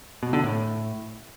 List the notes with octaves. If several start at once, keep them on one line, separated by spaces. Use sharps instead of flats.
B2
D3
A2